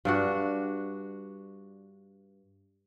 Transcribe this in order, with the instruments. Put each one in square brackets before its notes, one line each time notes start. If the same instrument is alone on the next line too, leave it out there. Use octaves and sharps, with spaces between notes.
[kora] G2 D4 F#4